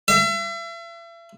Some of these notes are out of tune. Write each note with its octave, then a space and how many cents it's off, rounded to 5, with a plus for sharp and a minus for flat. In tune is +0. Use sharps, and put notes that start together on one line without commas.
E5 +40